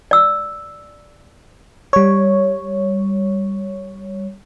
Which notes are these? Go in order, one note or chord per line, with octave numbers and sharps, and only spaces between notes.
D5 E6
G3 C#5